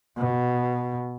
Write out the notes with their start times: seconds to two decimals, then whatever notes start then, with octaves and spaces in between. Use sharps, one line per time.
0.17 B2